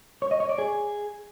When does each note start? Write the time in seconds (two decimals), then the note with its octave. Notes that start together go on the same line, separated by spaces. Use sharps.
0.22 C#5
0.31 D#5
0.40 C#5
0.49 D5
0.58 G#4